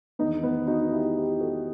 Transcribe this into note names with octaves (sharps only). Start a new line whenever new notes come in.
E2 D#3 B3 D#4
B3
D#4 F#4
E4 G4
E4 G4
F#4 A4